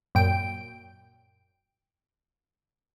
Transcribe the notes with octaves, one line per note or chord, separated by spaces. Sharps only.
F#2 A#2 G5 D7